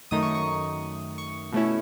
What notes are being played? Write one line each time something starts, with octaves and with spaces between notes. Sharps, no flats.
F#2 D#3 A3 D#4 D#6
C#6
C#6
C#6
B2 A3 C#4 E4